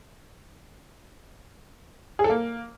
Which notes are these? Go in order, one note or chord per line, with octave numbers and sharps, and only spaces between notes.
G#4
A4
A#3